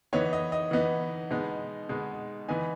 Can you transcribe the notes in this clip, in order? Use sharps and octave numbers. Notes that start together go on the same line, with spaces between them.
E3 B3 D#4 C#5
D#5
D#5
E3 B3 D#4
B2 G#3 B3 D#4
B2 G#3 B3 D#4
E3 B3 D#4 G#5